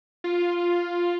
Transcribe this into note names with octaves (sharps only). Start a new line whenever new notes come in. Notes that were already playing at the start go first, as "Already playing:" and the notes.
F4